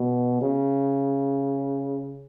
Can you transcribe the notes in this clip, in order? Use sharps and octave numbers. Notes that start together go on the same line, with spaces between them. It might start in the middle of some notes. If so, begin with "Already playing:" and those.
Already playing: B2
C#3